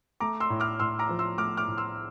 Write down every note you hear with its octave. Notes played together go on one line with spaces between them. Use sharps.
A3 A#5 D6
C6 E6
A2
D6 F6
A2 C6 E6
A#5 D6
F3
C6 E6
A3 D6 F6
D6 F6
A2
C6 E6